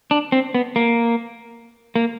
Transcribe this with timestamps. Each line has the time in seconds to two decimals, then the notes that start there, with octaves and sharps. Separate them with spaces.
0.11 D4
0.32 C4
0.55 B3
0.76 A#3
1.96 A#3